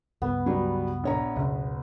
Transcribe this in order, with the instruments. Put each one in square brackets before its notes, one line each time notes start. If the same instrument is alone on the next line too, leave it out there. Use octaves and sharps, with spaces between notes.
[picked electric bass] C#2 G2 [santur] B3
[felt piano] F#3 G3
A#1 C#5 A#5
[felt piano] F#1 [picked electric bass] C#2 B2